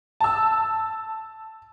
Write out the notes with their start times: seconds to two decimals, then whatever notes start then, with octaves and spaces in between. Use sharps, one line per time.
0.20 A5 E6